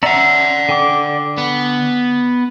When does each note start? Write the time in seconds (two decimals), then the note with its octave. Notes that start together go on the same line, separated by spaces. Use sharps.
0.03 C#4 D5 E5 F#5 A#5
0.69 D3 G5 D6
1.38 B3